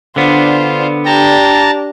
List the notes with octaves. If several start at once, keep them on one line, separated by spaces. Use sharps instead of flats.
D3 B3 D4 F4 C5
D4 G4 G5 A5 A#5